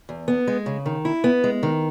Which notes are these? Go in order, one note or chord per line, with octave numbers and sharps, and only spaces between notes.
E2
B3
G#3
C#3
D#3
E4
B3
G#3
D#3